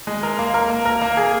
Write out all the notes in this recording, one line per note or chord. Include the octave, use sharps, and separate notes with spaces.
G#3
A#4
A#3
A#4
A#3
A#4
A#3
G#4